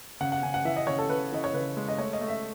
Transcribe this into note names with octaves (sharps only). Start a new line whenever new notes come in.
C#3 F#5
F#5
C#3 G#5
F#5
E3 E5
D#5
C#3 C#5
A4
C#3 B4
E3 D#5
C#5
C#3 B4
G#3
D#5
A3 C#5
D#5
A3
E5